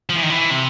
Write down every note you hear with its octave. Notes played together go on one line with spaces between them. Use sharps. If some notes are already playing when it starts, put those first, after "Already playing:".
F3
E3
D#3
E3
C3